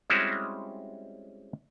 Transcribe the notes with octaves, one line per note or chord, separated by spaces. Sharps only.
G3 G#3 C4 C#4 E4 F#4